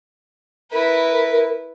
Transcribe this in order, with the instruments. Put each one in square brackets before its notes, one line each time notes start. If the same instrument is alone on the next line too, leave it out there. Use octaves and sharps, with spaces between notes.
[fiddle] E4 B4 [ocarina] A#4